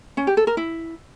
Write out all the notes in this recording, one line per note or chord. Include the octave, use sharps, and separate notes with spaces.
C#4
G4
A4
A#4
E4